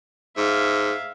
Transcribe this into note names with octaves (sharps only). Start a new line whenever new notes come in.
G#2 E5 F5